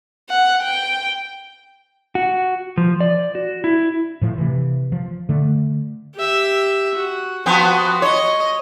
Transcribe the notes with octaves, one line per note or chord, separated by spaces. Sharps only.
F#5
G5
F#4
F3
D5
F#4
E4
A2 F3
C3 E3
F3
D3 A3
G4 E5
F#4
F3 B3 C4 F#4
C#5 D#5